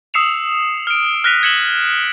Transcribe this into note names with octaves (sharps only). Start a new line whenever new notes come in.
D#6 E6 C7 C#7 E7 F7
F6 D7
F6 F#6 A#6 B6 D#7 F7
G#6 B6 C#7 E7 F#7